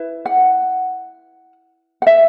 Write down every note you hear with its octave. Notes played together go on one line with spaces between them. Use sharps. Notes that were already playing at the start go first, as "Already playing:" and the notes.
Already playing: E4 B4
F#5
F#5
E5